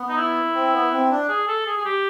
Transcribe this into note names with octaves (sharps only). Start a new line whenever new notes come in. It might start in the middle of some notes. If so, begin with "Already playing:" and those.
Already playing: B3
D#4
E4
C4
B3
C4
D4
G#4
A4
G#4
G#4
G4